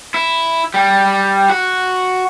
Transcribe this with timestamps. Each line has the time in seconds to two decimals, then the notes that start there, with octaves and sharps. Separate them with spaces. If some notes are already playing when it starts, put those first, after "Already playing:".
0.14 E4
0.74 G3
1.50 F#4